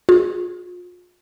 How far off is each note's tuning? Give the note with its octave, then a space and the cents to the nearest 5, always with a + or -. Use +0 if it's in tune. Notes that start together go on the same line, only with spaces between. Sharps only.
F4 +35 G#4 +0